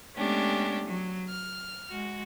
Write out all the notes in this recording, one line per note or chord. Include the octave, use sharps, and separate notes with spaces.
G#3 A3 B3 C#4 D4 G4
F#3
F6
G#3 F#4